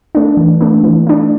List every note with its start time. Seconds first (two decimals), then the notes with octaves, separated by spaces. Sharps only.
0.15 A3 D4
0.37 E3
0.61 A3 D4
0.84 E3
1.07 A3 D4